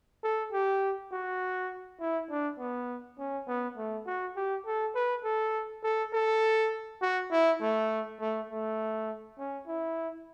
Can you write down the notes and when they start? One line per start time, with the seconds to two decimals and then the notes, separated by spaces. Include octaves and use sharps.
0.24 A4
0.52 G4
1.12 F#4
2.00 E4
2.30 D4
2.59 B3
3.19 C#4
3.48 B3
3.77 A3
4.07 F#4
4.36 G4
4.66 A4
4.95 B4
5.24 A4
5.83 A4
6.13 A4
7.02 F#4
7.32 E4
7.61 A3
8.20 A3
8.50 A3
9.39 C#4
9.67 E4